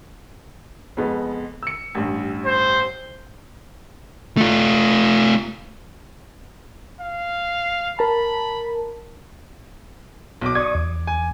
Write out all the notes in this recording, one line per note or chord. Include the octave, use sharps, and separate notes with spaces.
F2 G#3 B3
E6 C#7
A1 G2
C5
A3 F4
F5
A#4 A5 B5
B1 D6
D5 C#6 D#6 G#6
E2
G#5